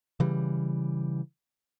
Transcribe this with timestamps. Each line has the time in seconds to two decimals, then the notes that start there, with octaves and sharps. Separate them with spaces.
0.20 C#3 E3 G3